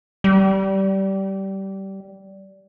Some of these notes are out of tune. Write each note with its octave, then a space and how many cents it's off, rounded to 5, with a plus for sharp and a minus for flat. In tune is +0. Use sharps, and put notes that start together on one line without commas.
G3 -20